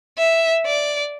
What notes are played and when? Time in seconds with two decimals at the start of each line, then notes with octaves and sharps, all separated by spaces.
0.18 E5
0.66 D5